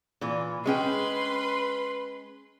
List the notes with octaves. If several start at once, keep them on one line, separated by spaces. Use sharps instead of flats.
A#2 E3
G#3 C#4 B4 G5 C6